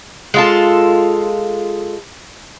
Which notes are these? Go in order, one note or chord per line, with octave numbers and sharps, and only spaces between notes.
G#3 F4 A4